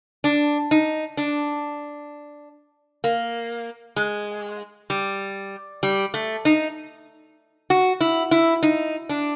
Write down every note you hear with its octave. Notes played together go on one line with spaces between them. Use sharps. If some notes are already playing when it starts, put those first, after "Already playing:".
D4
D#4
D4
A#3
G#3
G3
G3
A3
D#4
F#4
E4
E4
D#4
D4